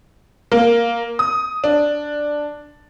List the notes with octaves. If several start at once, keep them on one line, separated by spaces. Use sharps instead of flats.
A#3
D#6
D4